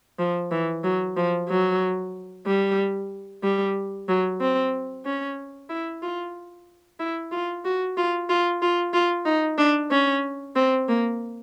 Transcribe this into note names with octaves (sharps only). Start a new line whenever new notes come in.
F3
E3
F#3
F3
F#3
G3
G3
F#3
C4
C#4
E4
F4
E4
F4
F#4
F4
F4
F4
F4
D#4
D4
C#4
C4
A#3